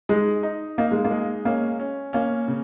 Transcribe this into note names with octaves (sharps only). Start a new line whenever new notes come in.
G#3 D#4
D#4
A#3 D#4
G#3
A#3
G#3
A#3 C#4
C#4
A#3 C#4
C#3